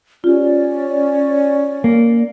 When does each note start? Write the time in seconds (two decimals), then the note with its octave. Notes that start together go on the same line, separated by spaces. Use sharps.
0.24 C#4 F4 G4 D5
1.84 A#3